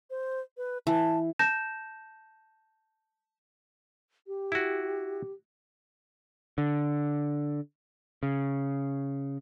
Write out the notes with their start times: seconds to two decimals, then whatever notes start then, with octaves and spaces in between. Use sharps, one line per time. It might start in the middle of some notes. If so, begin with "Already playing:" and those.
0.10 C5
0.57 B4
0.87 E3 A5
1.39 A5 G6 A#6 E7
4.27 G4
4.52 E4 F#4
6.58 D3
8.23 C#3